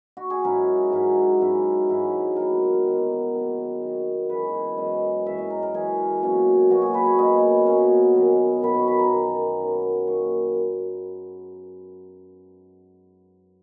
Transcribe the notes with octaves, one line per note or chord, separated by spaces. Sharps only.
F#4
G#4
G#2 F#3 C#4 E4 A#4
G#2 F#3 C#4 E4
G#2 F#3 C#4 E4
G#2 F#3 C#4 E4
D#3 F#3 B3 A#4
D#3 F#3 B3
D#3 F#3 B3
D#3 F#3 B3
F#2 E3 G#3 C#4 B4
C#5
F#2 E3 G#3 C#4 D#5
F#2 E3 G#3 C#4 E5
D#5
A#4
A#4
F#2 E3 G#3 C#4 G#4
B2 F#3 A#3 C#4
B2 F#3 A#3 C#4 F#4
G#4
B4
C#5
B2 F#3 A#3 C#4 D#5
B2 F#3 A#3 C#4
F#2 D#3 F#3 B3
F#2 D#3 F#3 B3 B5
C#6
B5
A#5
F#2 D#3 F#3 B3
F#2 D#3 F#3 B3
D#3 A#3 C#4 C#6